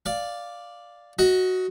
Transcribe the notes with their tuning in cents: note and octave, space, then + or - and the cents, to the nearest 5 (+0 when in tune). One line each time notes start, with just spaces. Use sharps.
D5 +0 F5 +0
F#4 +0 D#5 +30